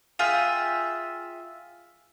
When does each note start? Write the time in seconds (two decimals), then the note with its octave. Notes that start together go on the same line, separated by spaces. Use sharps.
0.19 F4 G#4 E5 G5